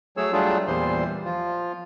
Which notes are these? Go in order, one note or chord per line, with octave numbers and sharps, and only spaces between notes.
F#3 A3 G#4 C#5 E6
F#3 G3 A3 D4 F4 G#4
E2 A#2 E3 G3 C5 C6
F3 F4